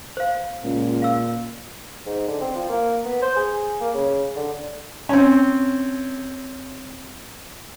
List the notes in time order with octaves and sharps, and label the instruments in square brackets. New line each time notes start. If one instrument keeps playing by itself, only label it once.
[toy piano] C5 F5
[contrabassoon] C#2 [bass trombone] A#2
[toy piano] F5 E6
[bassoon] G#2
D3
C4
F3
A#3
B3
C5
G#4
A#3
C#3
D3
[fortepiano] C4 C#4